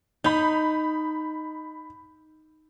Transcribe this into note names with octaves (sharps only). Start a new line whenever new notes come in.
D#4 B5 G6